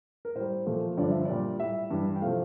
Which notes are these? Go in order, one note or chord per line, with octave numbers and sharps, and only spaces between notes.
A#4
A2 G3 C5
A#2 F3 A3
G2 D3 F3 D5
E5
A#2 G3 D5
A2 G3 E5
G2 E3 G3
G5
C3 F3 A3 F5